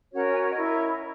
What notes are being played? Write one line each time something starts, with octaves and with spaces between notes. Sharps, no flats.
C#4 F#4 A#4 C#5 F#5
G#5
E4 A#4 C#5 D#5